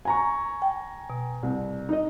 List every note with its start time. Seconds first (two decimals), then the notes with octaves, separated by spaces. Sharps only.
0.05 G#5 A#5 C#6
0.62 G5
1.10 B2
1.43 C2
1.89 D#4 D#5